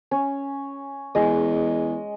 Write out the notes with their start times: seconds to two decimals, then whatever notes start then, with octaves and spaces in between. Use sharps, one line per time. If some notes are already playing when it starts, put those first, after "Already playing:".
0.11 C#4
1.15 E2 G#3 D#5